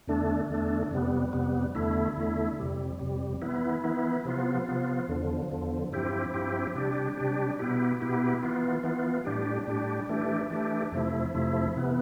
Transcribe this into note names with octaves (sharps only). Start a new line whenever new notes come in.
E2 D3 A3 D4
E2 D3 A3 D4
F2 C3 G3 B3
F2 C3 G3 B3
E2 D3 A3 E4
E2 D3 A3 E4
F2 C3 G3
F2 C3 G3
E3 B3 E4
E3 B3 E4
C3 F3 B3 F4
C3 F3 B3 F4
E2 D3 F3
E2 D3 F3
G2 F3 C4 E4 G4
G2 F3 C4 E4 G4
C3 G3 D4 G4
C3 G3 D4 G4
B2 B3 E4 G4
B2 B3 E4 G4
E3 B3 F4
E3 B3 F4
A2 G3 D4 G4
A2 G3 D4 G4
E3 A3 D4 G4
E3 A3 D4 G4
F2 C3 F3 A3 E4
F2 C3 F3 A3 E4
C3 E3 B3